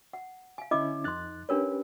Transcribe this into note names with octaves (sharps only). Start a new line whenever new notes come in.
F#5
F5 G#5
D3 C#4 E4 D#5 D6
F2 D#4 C6 F#6 A6
C#4 D4 G4 A#4 B4 C#5